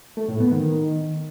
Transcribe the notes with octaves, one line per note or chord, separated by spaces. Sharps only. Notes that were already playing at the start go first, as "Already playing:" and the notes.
A3
A2
B3
D#3